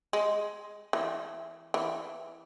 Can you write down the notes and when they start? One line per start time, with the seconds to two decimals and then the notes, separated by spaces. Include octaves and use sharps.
0.13 G#3
0.93 E3
1.74 E3